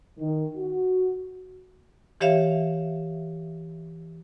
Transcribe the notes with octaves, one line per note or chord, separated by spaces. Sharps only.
D#3
F#4
E3 G4 C#5 E5 F5